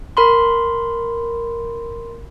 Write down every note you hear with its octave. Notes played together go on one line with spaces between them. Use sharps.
A#4 B5 C6